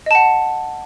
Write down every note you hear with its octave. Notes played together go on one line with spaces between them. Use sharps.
D#5 F#5 A5